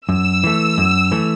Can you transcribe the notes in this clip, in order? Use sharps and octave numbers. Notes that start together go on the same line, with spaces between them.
F#2 E6
E3 A3
F#2
E3 A3